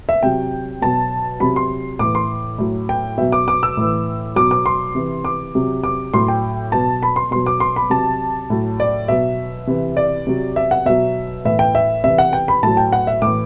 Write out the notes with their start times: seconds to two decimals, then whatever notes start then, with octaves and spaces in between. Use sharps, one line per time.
0.09 E5
0.23 C3 F#3 G5
0.82 B2 F#3 A5
1.40 C3 F#3 B5
1.56 C6
1.99 A2 E3 D6
2.15 C6
2.58 A2 F#3
2.89 G5
3.17 B2 F#3 E5
3.32 D6
3.48 D6
3.63 E6
3.77 A2 E3
4.36 B2 F#3 D6
4.51 D6
4.66 C6
4.95 C3 E3
5.25 D6
5.55 C3 F#3
5.84 D6
6.13 A2 F#3 C6
6.28 G5
6.72 B2 F#3 A5
7.03 B5
7.16 C6
7.31 B2 F#3 C6
7.46 D6
7.60 C6
7.76 B5
7.90 C3 F#3 A5
8.50 A2 F#3
8.80 D5
9.08 B2 F#3 E5
9.67 C3 E3
9.97 D5
10.27 C3 F#3
10.56 E5
10.71 F#5
10.85 B2 F#3 E5
11.45 A2 E3 E5
11.59 G5
11.75 E5
12.04 C3 E3 E5
12.18 F#5
12.33 G5
12.48 B5
12.63 A2 F#3 A5
12.77 G5
12.93 F#5
13.07 E5
13.22 A2 E3 D6